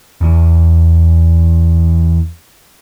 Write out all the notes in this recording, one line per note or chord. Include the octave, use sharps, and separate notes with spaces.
E2 E3